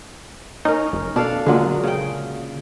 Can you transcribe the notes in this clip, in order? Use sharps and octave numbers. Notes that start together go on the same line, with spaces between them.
C#4 D#4 A#4
F#1
B2 D4 A4 F5
A#2 D3 F#3 G#3
C#3 G5